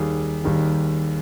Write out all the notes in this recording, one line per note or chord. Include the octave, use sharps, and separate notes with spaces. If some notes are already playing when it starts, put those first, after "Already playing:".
Already playing: D#2 D#3 G3 G#4
D#2 D#3 G3